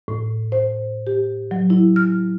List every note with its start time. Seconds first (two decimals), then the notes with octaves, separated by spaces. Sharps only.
0.08 A2
0.52 C5
1.07 G4
1.51 F#3
1.70 E4
1.96 F6